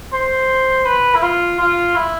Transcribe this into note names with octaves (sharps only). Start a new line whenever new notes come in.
C5
B4
E4
F4
F4
E4